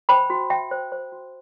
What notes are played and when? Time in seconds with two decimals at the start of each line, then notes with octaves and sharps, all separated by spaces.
0.09 C5 G5 B5
0.30 F#4
0.50 F#4 E5 G5
0.71 C5
0.92 C5
1.12 F#4